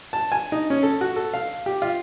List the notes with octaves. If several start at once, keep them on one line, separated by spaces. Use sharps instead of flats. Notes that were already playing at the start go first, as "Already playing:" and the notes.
A5
G#5
D#4
C#4
A4
F#4
A4
F5
G4
F4